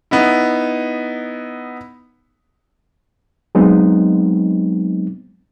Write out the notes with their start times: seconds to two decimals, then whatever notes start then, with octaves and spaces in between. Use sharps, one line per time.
0.11 B3 D#4 E4
3.55 F#3 G#3 B3 C4 D#4